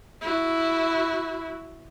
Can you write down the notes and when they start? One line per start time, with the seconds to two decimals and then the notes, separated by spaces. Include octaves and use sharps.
0.21 E4 F#4